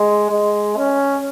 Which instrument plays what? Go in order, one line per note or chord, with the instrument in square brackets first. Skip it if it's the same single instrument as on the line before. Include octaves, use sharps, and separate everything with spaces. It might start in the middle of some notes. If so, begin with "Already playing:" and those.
Already playing: [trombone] G#3
G#3
C#4